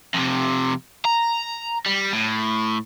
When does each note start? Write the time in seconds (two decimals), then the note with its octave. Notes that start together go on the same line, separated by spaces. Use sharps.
0.14 F2 C3
1.05 A#5
1.86 G3
2.13 A2